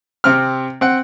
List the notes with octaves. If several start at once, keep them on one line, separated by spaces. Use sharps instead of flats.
C3 C4 F6
C4 F#5